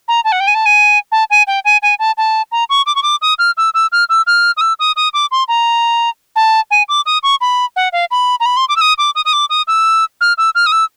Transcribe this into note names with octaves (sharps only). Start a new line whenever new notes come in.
A#5
A5
F#5
G5
G#5
A5
G#5
A5
G#5
G5
G#5
G#5
A5
A5
A#5
C#6
D6
C#6
D6
D#6
F6
E6
E6
F6
E6
F6
D#6
E6
D#6
D#6
D6
C6
A#5
A5
G#5
D6
D#6
C#6
B5
F#5
F5
B5
A#5
B5
C6
D6
E6
D#6
D6
D#6
D#6
D6
D#6
E6
F6
E6
F6
D#6
E6